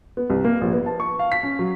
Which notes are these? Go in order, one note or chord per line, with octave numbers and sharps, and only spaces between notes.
B3
C2
A#3
A#1
B3
A5
C#6
F5
B6
C#4
F#3